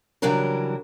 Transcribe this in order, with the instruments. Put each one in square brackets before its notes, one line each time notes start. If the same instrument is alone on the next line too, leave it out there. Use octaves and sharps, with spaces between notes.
[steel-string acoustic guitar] C#3 E3 F#3 G3 D4 A#4